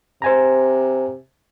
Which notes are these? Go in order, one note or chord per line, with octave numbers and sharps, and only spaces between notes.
C3 C5 G#5 A#5